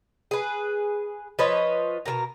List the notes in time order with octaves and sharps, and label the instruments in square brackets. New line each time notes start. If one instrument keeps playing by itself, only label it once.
[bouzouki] G#4 B4
F3 B4 C#5 D#5
B2 F3 A#4 A#5